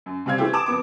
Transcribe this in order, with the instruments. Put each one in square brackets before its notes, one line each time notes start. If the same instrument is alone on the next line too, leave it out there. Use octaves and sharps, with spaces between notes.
[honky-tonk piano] F#2
C3 G3 C4 F5 G#6
E3 A3 C4 E4 G4
A5 D6 D#6 E7
F2 B3 D6